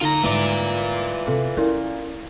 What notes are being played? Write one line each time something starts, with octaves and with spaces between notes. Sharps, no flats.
D3 D#4 F4 A#5
G#2 E3 G3 F4 D5
C3 A4
A#2 C#4 E4 A#4